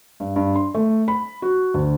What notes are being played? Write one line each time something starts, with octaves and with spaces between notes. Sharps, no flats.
G2
G2
C6
A3
B5
F#4
D2